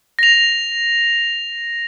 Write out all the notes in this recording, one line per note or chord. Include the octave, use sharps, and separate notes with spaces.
A#6 F7